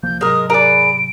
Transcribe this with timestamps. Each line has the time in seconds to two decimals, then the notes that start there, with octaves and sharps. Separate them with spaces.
0.03 C2 F3 A#3 G6
0.21 G#1 C3 F#3 G#3 A#4 D#6
0.50 G#4 A#4 B4 D5 D7